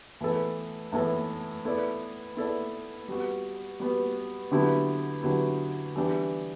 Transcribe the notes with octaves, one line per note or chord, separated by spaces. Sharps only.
A2 E3 B3 E4 A4
A2 E3 B3 E4 A4
B3 E4 A4 D5
B3 E4 A4 D5
G3 B3 F#4
G3 B3 F#4
D3 F#3 B3 E4 G4
D3 F#3 B3 E4 G4
E3 G3 B3 D4 G4